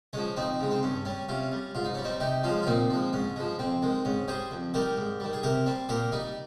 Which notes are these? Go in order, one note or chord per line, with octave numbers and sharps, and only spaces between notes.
F3 G#3 C#4
F2 C4 D#4
C#3 G#3
C4
G2 C#4
G3 C#4
C3 C#4 F4
G3
G#2 F4
D#4
G3 C#4
C4 D#4
C3 D#4 G4
F3 G#3 C#4 F4
F4
A#2 C4 D#4
F3 G#3
G#2 C#4
F3 G#3
F2 C4
D#3 G#3
G#2 C#4
G3 G#4 C5
F2
D#3 G3 G4 A#4
G#2
D#3 G3
G#4
C3 G4 A#4
G3 C4
A#2 G4 A#4
G3 D#4 G4